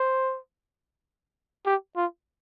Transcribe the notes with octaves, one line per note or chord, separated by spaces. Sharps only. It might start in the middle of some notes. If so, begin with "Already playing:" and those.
Already playing: C5
G4
F4